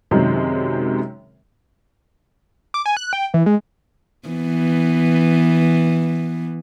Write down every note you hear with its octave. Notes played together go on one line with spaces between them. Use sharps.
F#2 C3 D#3 G#3 D#4
D6
G#5
F#6
G5
E3
G#3
E3 B3